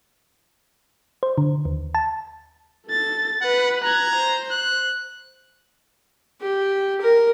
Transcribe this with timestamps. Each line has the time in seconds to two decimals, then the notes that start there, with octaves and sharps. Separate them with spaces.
1.23 C5
1.38 D3
1.65 D#2
1.95 A5
2.88 A4 A6
3.41 B4 F#5
3.84 A#5 F#6 G#6
4.16 C5
4.51 F#6
6.41 G4
7.01 A#4